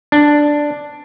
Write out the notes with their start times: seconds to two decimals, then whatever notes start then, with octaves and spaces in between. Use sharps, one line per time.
0.12 D4